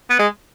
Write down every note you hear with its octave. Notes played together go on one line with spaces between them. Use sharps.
B3
G#3